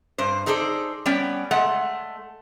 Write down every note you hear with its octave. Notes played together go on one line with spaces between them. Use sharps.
G2 C5
D#4 G#4 A4 C5 D5
G3 B3 C#4 D5 G5
G#3 A3 F#5